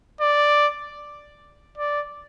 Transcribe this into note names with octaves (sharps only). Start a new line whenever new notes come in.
D5
D5